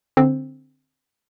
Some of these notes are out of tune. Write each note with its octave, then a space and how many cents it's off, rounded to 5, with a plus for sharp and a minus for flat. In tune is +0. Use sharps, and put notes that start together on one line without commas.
D3 +0 C4 +5